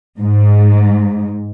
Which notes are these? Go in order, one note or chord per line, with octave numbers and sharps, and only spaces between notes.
G#2